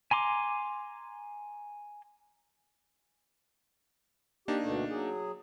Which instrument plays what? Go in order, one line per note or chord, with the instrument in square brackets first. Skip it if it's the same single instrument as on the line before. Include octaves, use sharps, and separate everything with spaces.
[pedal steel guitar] G#5 A#5 C6 D6
[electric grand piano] A#3 D4 D#4 [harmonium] G4
[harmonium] D2 B2 A3
F#3 G#4